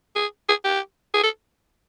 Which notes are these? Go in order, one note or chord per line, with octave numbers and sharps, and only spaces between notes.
G#4
G#4
G4
G#4
A4